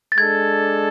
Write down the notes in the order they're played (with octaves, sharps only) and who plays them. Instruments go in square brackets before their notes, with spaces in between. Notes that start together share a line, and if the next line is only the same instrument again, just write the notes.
[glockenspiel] A6
[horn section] G#3 D4 A4 [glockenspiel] G#6